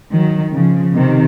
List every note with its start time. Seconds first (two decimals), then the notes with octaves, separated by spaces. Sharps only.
0.12 D#3 F#3
0.53 C#3 F3
0.94 C3 D#3